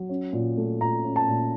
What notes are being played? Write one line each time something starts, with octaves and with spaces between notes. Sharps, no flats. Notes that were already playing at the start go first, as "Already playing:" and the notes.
Already playing: F#3
C#4
A#2
A3
A#2 A#5
C#4
A5
A#2